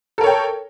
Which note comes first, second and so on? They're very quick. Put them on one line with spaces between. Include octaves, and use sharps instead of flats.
A4 A#4 C#5 G5